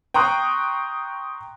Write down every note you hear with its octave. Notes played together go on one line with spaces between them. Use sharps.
G5 A#5 C6 C#6 D#6 F#6